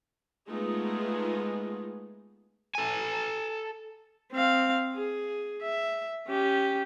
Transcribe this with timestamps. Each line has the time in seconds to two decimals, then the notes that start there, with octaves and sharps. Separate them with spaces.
0.48 G#3 A3 B3 D#4 F4 G#4
2.75 A4 G#5
4.32 C4 F5
4.95 G#4
5.62 E5
6.27 C#4 G4